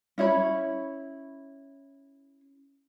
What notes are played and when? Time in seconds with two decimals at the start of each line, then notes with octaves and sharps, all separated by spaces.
0.18 C#4 E4 C#5 B5